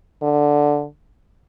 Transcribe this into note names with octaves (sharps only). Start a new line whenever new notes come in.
D3